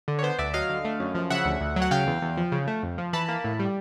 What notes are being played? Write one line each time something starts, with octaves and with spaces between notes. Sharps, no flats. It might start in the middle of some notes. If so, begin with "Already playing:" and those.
D3
C#5
B3 C5
D2 D5 E5
F#3 D#5 F5
D3
A3
F#2
F3
C#3 E5 F#5
D2
D2
F#3
F#5
C#3 F5 G5
E2
E2
F3
C#3
A3
F2
F3
E3 A5 B5
A#3
A2
G3